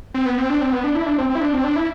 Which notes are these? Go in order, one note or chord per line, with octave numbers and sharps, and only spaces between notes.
C4
B3
C4
D4
C4
B3
D4
E4
D4
C4
C4
E4
D4
C4
D4
E4